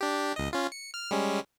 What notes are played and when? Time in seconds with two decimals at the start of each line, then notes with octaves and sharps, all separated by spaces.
0.01 D4 G4
0.36 C#2 D#5
0.53 C#4 F4
0.72 C#7
0.94 F6
1.11 G3 G#3 C#4